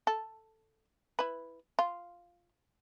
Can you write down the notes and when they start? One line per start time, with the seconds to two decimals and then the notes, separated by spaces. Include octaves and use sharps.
0.07 A4
1.19 E4 B4
1.79 F4